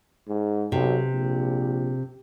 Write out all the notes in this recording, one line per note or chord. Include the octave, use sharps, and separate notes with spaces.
G#2
B1 C3
A#1